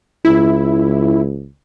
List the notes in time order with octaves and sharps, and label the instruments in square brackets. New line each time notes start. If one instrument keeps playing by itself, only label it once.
[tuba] C#2 [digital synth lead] E4